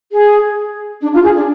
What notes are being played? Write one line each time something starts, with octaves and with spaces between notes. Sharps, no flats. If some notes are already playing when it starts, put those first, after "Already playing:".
G#4
D4
F4
G#4
D4